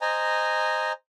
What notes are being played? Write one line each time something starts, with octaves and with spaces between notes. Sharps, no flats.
C5 D#5 G#5 A#5